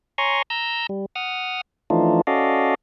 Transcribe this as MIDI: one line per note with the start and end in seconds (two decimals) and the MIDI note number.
0.18 0.42 73
0.18 0.42 80
0.18 0.42 82
0.18 0.42 84
0.18 0.42 85
0.50 0.87 82
0.50 0.87 88
0.50 0.87 91
0.89 1.06 55
1.16 1.61 78
1.16 1.61 87
1.16 1.61 89
1.90 2.21 52
1.90 2.21 53
1.90 2.21 57
1.90 2.21 62
1.90 2.21 63
1.90 2.21 65
2.27 2.75 61
2.27 2.75 66
2.27 2.75 69
2.27 2.75 74
2.27 2.75 75
2.27 2.75 77